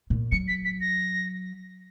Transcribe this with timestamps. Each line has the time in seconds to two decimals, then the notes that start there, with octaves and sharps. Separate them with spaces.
0.10 A#2
0.32 F#3 C#7
0.48 B6
0.65 B6
0.81 A#6